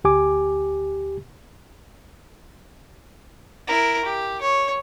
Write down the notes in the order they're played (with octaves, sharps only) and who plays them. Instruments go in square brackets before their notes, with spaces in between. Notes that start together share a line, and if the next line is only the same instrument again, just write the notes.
[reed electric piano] D2 G4 G#5 D6
[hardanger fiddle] E4 A#4
G4
C#5